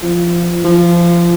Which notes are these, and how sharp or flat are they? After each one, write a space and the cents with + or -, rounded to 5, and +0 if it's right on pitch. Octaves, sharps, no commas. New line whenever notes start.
F3 -20
F3 -20